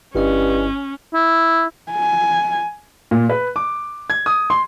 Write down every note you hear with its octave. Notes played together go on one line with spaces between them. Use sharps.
G1 G2 C#4 E4 D#5
E4
G#5
A#2
B4
D6
G#6
D#6
C6